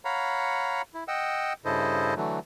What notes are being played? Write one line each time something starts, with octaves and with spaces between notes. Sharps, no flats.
C#5 F5 F#5 A#5 B5
E4
D#5 F#5 G5 E6
G2 C#3 E4 A4 C5 D#5
D3 E3 F#3 A3